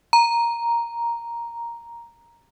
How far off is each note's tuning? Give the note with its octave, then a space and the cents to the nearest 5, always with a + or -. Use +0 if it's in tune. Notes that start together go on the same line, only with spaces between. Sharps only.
A#5 +5